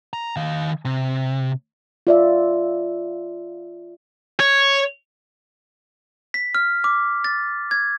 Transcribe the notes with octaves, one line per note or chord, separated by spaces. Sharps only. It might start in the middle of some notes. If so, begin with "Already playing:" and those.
A#5
D#3 F5
C3
F4 D5 E5
C#5
B6
F6
D6
A6
G#6